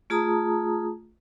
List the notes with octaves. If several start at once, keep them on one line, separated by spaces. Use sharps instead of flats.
A3 F4 G#4 A5 A#5 D#6